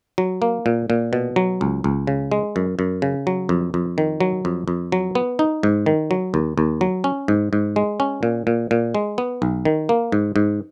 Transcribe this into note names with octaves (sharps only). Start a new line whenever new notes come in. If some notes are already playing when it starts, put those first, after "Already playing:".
F#3
A#3
A#2
A#2
B2
F#3
C#2
C#2
C#3
G#3
F#2
F#2
C#3
F#3
F2
F2
D#3
F#3
F2
F2
F#3
B3
D#4
G#2
D#3
F#3
D#2
D#2
F#3
C#4
G#2
G#2
G#3
C#4
A#2
A#2
A#2
G#3
B3
B1
D#3
A#3
G#2
G#2